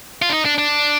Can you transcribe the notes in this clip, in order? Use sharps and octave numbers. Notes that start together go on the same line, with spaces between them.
F4
D4
D#4
D4
D4